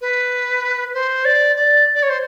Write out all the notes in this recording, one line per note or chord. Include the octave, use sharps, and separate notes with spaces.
B4
C5
D5
D5
D5
C#5
C5